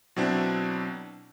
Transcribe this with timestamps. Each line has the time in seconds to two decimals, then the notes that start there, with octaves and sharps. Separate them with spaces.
0.16 B2 F#3 C4 D4 E4